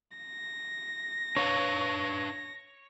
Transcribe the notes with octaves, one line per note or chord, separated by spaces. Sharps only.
A#6
D4 B4 C#5 F5